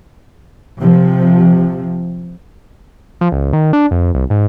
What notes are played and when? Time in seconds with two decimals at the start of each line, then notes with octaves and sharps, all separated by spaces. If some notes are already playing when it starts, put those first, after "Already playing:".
0.79 C3 F3
3.21 F3
3.32 C#2
3.53 D#3
3.73 D4
3.91 F2
4.14 C2
4.30 G#2